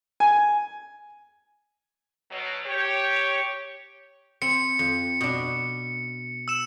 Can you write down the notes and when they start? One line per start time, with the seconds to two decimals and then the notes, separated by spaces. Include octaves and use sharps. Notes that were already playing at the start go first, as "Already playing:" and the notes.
0.20 G#5
2.30 B2 F#3
2.64 G4 C#5
4.42 C4 C#7
4.79 F2
5.21 B2 D4
6.48 E6 E7